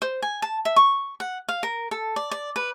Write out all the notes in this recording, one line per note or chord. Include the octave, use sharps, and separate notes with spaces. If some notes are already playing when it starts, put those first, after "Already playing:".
C5
G#5
A5
E5
C#6
F#5
F5
A#4
A4
D5
D5
B4